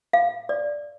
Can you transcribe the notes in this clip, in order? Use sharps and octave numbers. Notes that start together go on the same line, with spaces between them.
F5
D5